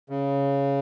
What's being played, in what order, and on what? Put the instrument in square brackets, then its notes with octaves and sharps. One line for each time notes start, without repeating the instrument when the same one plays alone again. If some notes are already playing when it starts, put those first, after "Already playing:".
[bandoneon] C#3